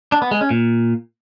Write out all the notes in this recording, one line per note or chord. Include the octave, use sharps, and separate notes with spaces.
D4
B3
G#3
C#4
A#2